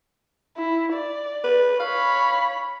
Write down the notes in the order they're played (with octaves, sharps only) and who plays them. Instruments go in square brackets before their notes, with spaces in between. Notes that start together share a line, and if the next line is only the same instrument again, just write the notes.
[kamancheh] E4
D5
[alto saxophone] B4
[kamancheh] C#5 B5 [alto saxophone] F5